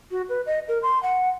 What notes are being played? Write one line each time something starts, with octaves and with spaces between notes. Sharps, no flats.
F#4
B4
D#5
A#4
C6
F#5